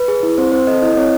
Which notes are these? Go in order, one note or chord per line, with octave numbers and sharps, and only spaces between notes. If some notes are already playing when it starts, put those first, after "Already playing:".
Already playing: B4
G#4
E4
C4 C5
C4 C5
A4 D#5
E4 D#5
C4 C#5